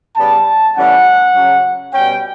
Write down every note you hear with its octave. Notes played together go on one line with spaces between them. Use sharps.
C#3 G3 B3 A5
A2 E3 G3 C#4 F#5
C#3 F#3 C#4
B2 G3 C#4 G5